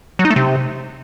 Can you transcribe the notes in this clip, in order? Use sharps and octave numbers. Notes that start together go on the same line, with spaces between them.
F#3
D#4
A3
C3